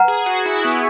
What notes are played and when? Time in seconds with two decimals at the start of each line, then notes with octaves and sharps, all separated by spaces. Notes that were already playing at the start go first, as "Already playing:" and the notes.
Already playing: B4 F#5 A#5
0.08 G#4
0.26 F#4
0.46 E4
0.65 B3